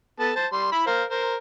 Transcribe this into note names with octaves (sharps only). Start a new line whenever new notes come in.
B3 A4 A5
C5 A5
G3 C6
E4 B5
A#4 C5 F5
A#4 C5